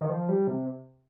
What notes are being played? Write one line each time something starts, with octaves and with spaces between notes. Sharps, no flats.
D#3
F3
G3
C3